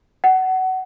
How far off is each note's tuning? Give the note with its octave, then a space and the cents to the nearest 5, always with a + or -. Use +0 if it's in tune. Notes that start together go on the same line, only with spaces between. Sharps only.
F#5 +20